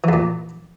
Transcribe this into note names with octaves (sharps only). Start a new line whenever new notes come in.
E2 A#2 E3